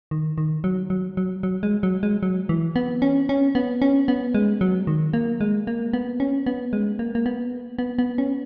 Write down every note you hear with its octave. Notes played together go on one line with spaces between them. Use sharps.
D#3
D#3
F#3
F#3
F#3
F#3
G#3
F#3
G#3
F#3
E3
B3
C#4
C#4
B3
C#4
B3
G#3
F#3
D#3
A#3
G#3
A#3
B3
C#4
B3
G#3
A#3
A#3
B3
B3
B3
C#4